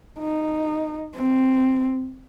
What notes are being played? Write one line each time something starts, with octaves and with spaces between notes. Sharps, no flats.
D#4
C4